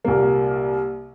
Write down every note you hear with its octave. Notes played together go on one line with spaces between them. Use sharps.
C2 A#2 G3 A#3